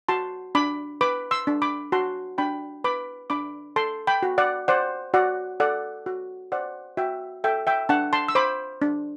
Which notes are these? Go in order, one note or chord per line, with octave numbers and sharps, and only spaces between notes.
F#4 A5 C6
D4 B5 D6
B4 B5 D6
C6 E6
D4
B5 D6
F#4 A5 C6
D4 G5 B5
B4 B5 D6
D4 B5 D6
A4 A5 C6
G5 B5
F#4
D5 F#5
C5 D5 F#5
F#4 D5 F#5
A4 D5 F#5
F#4
C5 D5 F#5
F#4 E5 G5
A4 E5 G5
E5 G5
D4 F#5 A5
A5 C6
E6
C5 B5 D6
D4